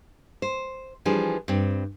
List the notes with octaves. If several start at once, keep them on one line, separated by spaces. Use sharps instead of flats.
C5
E3 F3 G3 D4 G#4
G2 C4